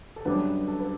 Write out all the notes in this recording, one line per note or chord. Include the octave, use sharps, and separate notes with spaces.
A4
F#2 D3 G3 B3 D4 B4
A4
B4